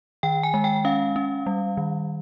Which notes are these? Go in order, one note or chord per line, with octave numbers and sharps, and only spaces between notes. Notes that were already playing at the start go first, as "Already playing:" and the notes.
D#3 G5
G#5
G#3
G5
C#4 F5
C#4
G3
D#3